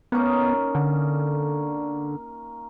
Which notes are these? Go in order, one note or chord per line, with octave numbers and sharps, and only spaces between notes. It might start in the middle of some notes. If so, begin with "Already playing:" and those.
A#3 B3 C#4 D#4
D3